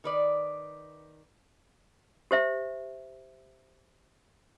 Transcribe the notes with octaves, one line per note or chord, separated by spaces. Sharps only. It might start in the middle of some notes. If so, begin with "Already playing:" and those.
D#3 B4 D5
G4 C5 E5